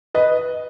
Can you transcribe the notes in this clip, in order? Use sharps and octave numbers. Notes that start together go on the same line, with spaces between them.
B4 D#5